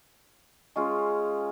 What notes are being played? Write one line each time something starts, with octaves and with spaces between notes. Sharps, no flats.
G#3 C#4 F4 G#4